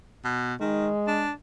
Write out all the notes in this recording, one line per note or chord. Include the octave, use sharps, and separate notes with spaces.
B2
D#3 G#3
D4